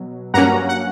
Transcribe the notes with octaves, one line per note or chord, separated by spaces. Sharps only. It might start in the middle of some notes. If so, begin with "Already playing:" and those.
Already playing: B2 F#3
G2 F#3 A#3 C#4 F#5 A#5
F#5